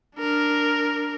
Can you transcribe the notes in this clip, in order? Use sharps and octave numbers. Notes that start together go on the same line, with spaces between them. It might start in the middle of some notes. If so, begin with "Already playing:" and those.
D4 A#4